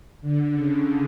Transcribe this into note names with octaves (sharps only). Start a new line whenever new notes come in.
D3
C#3